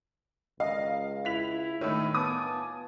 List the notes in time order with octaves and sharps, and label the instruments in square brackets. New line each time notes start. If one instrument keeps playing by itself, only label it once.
[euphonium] C#2 [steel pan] D#5 [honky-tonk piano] F5
[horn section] E4 [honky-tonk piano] B6 F7
[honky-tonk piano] A2 D#3 [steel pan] C#5 E6
[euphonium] B3 [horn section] F4 G#5 A5 [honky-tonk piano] D6 D#6